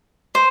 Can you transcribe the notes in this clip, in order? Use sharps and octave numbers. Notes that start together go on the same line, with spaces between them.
C5